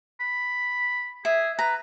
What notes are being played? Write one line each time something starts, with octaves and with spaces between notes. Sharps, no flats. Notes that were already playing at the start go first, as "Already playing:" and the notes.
B5
G#4 E5
B4 A#5